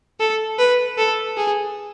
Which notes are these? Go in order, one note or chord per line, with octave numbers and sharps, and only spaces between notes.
A4
B4
A4
G#4